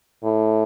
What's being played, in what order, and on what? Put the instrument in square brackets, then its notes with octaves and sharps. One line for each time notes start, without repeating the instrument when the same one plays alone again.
[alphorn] A2